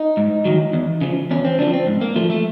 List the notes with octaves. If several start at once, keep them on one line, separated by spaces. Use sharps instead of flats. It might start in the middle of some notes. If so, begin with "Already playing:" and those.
Already playing: D#4
G#2
D#3 F#3
E2
C#3 F3
E2 C#4
C4
C#3 F3 D4
C4
G#2
A#3
F3 A3
A3